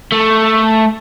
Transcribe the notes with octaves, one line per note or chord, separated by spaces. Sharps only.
A3